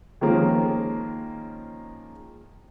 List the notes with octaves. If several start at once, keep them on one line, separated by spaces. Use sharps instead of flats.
D#3 F3 G#3 A#3 C#4